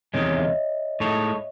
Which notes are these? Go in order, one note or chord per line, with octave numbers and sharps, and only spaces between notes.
E2 C3 D#3 G#3 C#5
C#5
E5
D#5
A2 G#3 D#4 A4 C#5